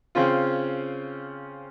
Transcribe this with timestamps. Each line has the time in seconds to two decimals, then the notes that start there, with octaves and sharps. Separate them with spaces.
0.15 C#3 C4 C#4 F4